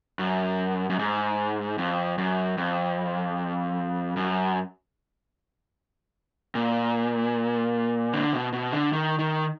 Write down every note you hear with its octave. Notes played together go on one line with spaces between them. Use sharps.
F#2
F#2
G#2
F2
F#2
F2
F#2
A#2
D3
B2
B2
D3
D#3
D#3